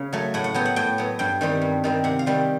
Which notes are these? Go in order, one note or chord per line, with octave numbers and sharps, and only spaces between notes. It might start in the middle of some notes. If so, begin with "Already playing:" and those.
Already playing: C#3
F#3 A3
A2 F#5
F#5
F#3 B3 G5
F#5
A2 G5
F#3 B3
G2 G5
D#3 G3 C4
G2
D#3 G3 C4
C3 F#5
F5
D#3 G3 C4